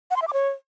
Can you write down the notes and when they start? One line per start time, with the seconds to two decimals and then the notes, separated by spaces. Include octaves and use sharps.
0.11 F#5
0.16 C6
0.22 E5
0.27 D6
0.33 C#5